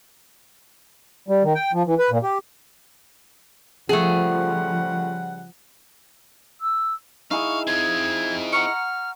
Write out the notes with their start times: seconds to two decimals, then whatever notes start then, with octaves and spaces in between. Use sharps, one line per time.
1.28 G3
1.43 D#3
1.55 G5
1.73 F3
1.86 E3
1.99 B4
2.11 A#2
2.23 G4
3.89 C#3 F3 G3 A3 G#4 F#5
6.61 E6
7.31 D#4 E4 G#4 F5 C#6
7.67 C4 F4 G#6
8.53 F#5 A#5 C#6 F6